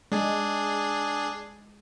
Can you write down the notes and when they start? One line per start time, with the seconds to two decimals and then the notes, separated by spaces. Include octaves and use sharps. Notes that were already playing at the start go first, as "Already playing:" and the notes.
0.12 G#3 D4 G#4